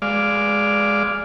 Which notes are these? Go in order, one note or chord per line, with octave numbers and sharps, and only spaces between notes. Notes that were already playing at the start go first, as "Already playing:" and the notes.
G#3 D5 F5